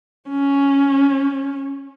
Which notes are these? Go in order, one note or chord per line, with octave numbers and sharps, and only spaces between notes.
C#4